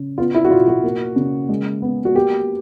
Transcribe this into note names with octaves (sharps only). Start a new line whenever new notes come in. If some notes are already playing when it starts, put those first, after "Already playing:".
Already playing: C#3
B3 F4
E4
F#4
B2 F4
F#4
A#3
C#3
G#3
B3
F#4
A#3 G4